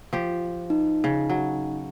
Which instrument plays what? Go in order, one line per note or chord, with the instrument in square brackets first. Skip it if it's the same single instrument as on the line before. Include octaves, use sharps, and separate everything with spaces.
[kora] F3 G4
[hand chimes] D#4
[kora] C#3
F#3